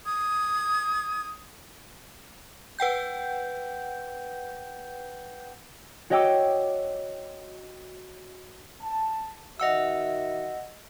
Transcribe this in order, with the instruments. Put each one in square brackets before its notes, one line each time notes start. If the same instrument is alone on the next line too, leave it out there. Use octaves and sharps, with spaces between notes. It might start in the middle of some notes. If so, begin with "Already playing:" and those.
[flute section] D#6 G#6
[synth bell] B4 F#5 G5 G6
[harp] F#4 C#5 D#5 G5 D6 E6
[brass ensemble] A5
[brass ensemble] D#3 F#4 E5 [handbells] D#5 F#5 E6